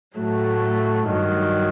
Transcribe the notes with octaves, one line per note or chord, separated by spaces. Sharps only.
A2 F#3 A3
G2 D#3 F#3